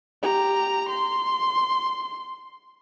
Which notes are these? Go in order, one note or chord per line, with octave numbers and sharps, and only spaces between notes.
G4 A#5
C6